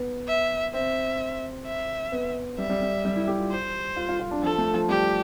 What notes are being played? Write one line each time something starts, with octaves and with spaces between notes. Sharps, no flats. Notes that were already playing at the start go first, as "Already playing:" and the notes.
Already playing: B3
E5
C4 E5
E5
B3
G3 E5
G3
G3
G3
E4
G4
F4
C5
F4
F4
F4
D4
F3 A4
A3
F3
G3 G4